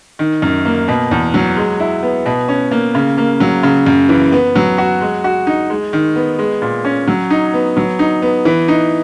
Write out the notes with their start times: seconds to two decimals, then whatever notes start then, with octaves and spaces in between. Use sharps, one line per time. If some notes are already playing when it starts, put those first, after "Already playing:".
0.19 D#3
0.42 F#2
0.65 A#3
0.88 B2
1.11 E2
1.34 F#3
1.57 G#3
1.80 E4
2.03 B3
2.26 B2
2.48 C#4
2.71 A#3
2.95 C#3
3.18 A#3
3.40 F#3
3.63 C#3
3.86 F#2
4.09 E3
4.32 B3
4.56 F#3
4.78 F#4
5.01 G#3
5.24 F#4
5.47 D#4
5.70 G#3
5.93 D#3
6.16 B3
6.39 G#3
6.62 A#2
6.85 C#4
7.07 F#3
7.30 D#4
7.54 B3
7.77 F#3
7.99 D#4
8.22 B3
8.45 E3
8.68 D#4